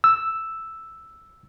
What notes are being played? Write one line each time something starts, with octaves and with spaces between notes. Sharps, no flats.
E6